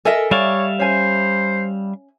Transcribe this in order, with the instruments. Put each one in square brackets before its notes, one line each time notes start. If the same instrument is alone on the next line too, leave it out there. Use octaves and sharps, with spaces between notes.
[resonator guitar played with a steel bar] A4 A#4 E5 [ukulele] D#5 G#5
[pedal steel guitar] G3 E5 F5 [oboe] C#5 [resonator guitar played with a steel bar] D5
[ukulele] C#4 G#5 [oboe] C5